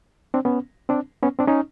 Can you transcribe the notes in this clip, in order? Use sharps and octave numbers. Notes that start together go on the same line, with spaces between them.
C4 D4
B3 C#4
C4 D4
B3 C#4
C4 D4
C#4 D#4